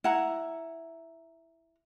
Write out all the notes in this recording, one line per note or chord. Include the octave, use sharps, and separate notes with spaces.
E4 F#5 A#5